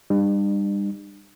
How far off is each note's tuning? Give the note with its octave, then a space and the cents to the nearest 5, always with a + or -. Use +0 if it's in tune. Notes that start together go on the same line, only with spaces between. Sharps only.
G3 +30 D4 +45